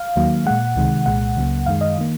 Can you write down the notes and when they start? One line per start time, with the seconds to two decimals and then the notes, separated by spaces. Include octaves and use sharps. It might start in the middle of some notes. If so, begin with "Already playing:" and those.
Already playing: F5
0.16 D#2 D#3 F#3 A#3
0.46 A#2 G#3 F#5
0.76 C#2 C3 D#3 G#3
1.06 C2 A#2 G#3 F#5
1.36 C#2 C#3 F#3 A#3
1.66 F#2 D#3 G#3 F5
1.81 D#5
1.98 D#3 A#3